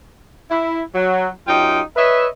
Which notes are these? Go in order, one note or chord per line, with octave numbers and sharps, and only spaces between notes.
E4
F#3
F#2 D#4 F4 G4 G5
B4 C#5 D#5 E5